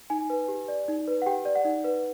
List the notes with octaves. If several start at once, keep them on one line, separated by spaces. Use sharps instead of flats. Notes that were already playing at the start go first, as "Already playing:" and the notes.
D#4 G#5
B4
G4
D5
D#4
B4
F#5
G4 G5
D5
F#5
D#4
B4